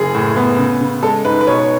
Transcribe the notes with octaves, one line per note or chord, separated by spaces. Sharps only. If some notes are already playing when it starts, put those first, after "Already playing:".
Already playing: F#1 G#4
A2
B3
C#3
C#3
G#3 A4
G#2 B4
B4
B2 C#5